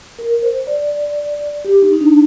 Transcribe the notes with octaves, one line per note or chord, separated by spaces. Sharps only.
A#4
C5
D5
G4
D#4
D#4
D4